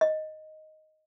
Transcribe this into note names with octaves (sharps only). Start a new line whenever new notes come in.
D#5